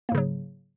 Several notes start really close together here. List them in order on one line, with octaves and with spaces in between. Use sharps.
A#3 G#2 C#3 F#3